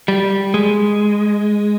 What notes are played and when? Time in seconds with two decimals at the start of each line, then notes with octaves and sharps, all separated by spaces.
0.08 G3
0.54 G#3